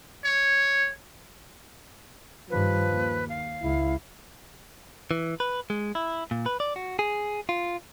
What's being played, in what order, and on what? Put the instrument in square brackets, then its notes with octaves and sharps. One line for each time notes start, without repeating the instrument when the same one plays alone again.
[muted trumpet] C#5
[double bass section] G2 D#3 G3 [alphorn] F3 [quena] B4
[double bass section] D#2
[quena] F5
[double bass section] C#2 [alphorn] E4
[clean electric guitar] E3
B4
G#3
E4
A#2
B4
D5
F#4
G#4
F4